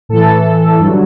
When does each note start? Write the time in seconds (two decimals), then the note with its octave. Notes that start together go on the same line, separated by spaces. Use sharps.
0.09 A2 E3 A4
0.79 G2 D3 F#3